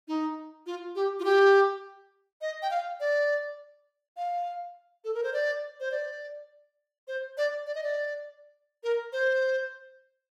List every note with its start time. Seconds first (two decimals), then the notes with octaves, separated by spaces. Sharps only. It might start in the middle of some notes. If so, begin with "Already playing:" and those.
0.08 D#4
0.66 F4
0.95 G4
1.20 F4
1.25 G4
2.41 D#5
2.62 G5
2.71 F5
3.00 D5
4.17 F5
5.04 A4
5.14 A#4
5.24 C5
5.33 D5
5.80 C5
5.91 D5
7.08 C5
7.37 D5
7.66 D5
7.75 D#5
7.83 D5
8.84 A#4
9.13 C5